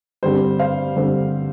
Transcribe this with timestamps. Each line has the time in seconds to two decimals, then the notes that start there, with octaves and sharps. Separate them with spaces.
0.23 G2 D3 G3 C4 C5
0.59 C5 F5
0.96 G2 D3 G3 C4